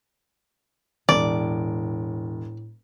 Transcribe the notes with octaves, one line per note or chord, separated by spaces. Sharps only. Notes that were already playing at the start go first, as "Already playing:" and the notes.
E1 A2 D5